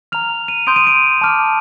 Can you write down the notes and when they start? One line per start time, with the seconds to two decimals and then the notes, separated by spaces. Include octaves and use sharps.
0.12 A#5 F6 F7
0.48 D#7
0.67 C6 D#6 G6 D7
0.76 D#7
0.87 D7
1.21 A5 D6 F6